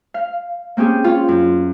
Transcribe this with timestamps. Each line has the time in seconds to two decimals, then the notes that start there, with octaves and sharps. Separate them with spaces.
0.14 F5
0.77 A#3 C4 C#4 G4 G#4
1.04 C#4 F4
1.28 F#2